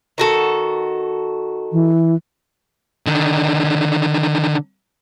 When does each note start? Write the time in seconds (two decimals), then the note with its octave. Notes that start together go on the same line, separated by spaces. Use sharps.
0.18 D#3 F#4 A4
1.72 E3
3.07 D3 D#3